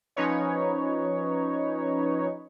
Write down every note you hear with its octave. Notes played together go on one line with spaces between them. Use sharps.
F3 C#4 D#4 B4 C#5